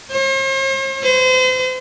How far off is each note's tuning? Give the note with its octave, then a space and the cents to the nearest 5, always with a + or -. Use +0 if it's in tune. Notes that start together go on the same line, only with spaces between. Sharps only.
C5 +45
C5 -35